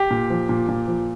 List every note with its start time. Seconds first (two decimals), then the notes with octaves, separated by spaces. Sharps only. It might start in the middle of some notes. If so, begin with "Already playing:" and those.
Already playing: G4
0.10 A#2
0.30 F3
0.49 A#2
0.69 A#2
0.88 F3